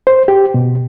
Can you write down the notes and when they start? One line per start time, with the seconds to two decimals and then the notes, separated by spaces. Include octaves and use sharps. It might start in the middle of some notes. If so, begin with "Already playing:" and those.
0.07 C5
0.28 G4
0.54 B2